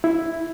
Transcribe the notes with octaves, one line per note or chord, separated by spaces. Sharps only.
E4